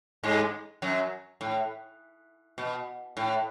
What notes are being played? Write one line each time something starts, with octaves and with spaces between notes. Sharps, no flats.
G#2 G#3
F#2 F#3
A2
B2
A2